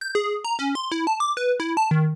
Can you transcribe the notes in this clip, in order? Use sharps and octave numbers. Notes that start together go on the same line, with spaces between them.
G6
G#4
A#5
C#4
C6
E4
A5
D6
B4
E4
A5
D#3